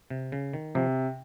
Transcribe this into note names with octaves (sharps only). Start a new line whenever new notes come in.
C3
C#3
D#3
C3 F3